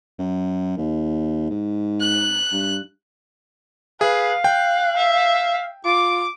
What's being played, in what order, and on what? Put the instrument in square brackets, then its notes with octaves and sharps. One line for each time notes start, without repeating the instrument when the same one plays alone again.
[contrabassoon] F#2
D#2
G#2
[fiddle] F#6
[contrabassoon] G2
[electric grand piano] G#4 [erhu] B4 [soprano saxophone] F5
[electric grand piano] G5 [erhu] F#6
[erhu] E5
[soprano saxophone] F4 [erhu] D6